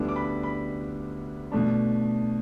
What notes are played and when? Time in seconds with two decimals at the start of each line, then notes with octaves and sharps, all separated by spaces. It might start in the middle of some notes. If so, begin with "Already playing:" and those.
Already playing: D2 D3 G3 B3 D4
0.09 D6
0.16 B5
0.43 B5
1.52 B2 A3 D4